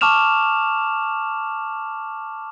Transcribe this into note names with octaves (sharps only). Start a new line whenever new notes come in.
A5 C#6 D6 F6 E7 F7